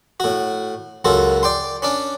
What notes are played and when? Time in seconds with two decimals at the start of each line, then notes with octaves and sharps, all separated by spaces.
0.20 A2 F#4
1.05 C#2 F#2 F4 F#4 A4
1.43 D5 G5 C6
1.82 C#4 D4 D5